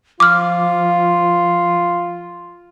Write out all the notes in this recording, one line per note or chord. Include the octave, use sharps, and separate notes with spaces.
F3 F4 D6 F6